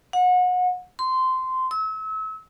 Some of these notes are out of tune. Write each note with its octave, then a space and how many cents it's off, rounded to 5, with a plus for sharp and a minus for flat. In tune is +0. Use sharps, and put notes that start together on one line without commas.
F#5 -30
C6 -15
E6 -35